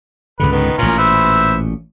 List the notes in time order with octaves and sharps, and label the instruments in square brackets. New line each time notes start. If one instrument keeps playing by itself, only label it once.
[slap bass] C#2 G#2 D3 [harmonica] B4
[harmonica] D#3 B3
[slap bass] A1 A#2 [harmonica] C#4 F4 A#4
[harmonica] B4 C5 E5